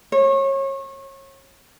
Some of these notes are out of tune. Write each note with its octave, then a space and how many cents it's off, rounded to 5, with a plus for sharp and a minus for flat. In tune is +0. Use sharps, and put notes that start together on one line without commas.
C#5 -30